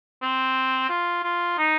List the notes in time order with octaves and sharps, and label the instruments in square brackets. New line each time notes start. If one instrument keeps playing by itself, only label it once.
[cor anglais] C4
F4
F4
D#4